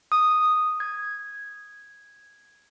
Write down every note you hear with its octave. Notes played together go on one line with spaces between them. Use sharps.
D#6
G#6